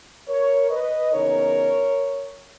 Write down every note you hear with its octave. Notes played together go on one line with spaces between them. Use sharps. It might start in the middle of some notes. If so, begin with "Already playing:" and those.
A#4 C#5
B4 D#5
C#3 E3 B3 D#4 A#4 C#5